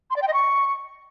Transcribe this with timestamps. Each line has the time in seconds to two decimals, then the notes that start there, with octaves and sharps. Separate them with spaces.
0.10 C6
0.16 D5
0.22 G5
0.28 D#5
0.33 C#6